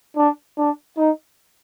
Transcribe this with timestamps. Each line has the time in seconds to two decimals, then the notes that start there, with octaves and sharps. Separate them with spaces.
0.16 D4
0.58 D4
0.97 D#4